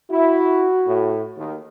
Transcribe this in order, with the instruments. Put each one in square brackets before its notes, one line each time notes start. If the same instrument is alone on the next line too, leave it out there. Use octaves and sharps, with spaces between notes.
[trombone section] E4 [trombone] F#4
[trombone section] A2
D#2 D#3